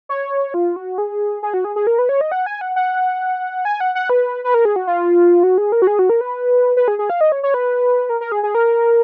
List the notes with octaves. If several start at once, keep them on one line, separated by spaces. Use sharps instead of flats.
C#5
F4
F#4
G#4
G#4
F#4
G#4
G#4
A#4
B4
C#5
D#5
F#5
G#5
F#5
F#5
G#5
F#5
F#5
B4
B4
A#4
G#4
F#4
F4
F#4
G#4
A#4
F#4
G#4
F#4
A#4
B4
B4
G#4
G#4
F5
D#5
C#5
C#5
B4
A#4
A#4
G#4
G#4
A#4